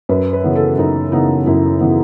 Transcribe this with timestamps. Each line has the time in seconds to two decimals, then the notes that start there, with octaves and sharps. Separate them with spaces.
0.09 F#2 B4
0.33 B4
0.44 C#3 E3 B3
0.56 A4
0.78 F#2 D#4
1.12 C#3 E3 B3 D#4
1.46 F#2 E4
1.80 C#3 E3 B3